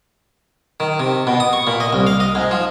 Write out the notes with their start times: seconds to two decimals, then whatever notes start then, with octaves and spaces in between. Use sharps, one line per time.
0.80 D#3
1.00 C3
1.27 B2
1.40 D#6
1.53 C#6
1.67 A#2
1.80 D#5
1.93 C2
2.07 F5
2.20 D#5
2.35 G#2
2.51 F3